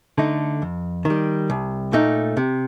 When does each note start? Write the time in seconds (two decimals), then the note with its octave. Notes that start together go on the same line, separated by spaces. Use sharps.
0.18 D3 A3 D#4
0.62 F2
1.05 D#3
1.10 G3
1.50 C2
1.93 A#2 A3 D#4
2.37 C3